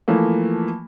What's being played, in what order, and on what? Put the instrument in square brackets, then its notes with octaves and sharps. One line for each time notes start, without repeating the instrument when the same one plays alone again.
[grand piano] E3 F3 A3 A#3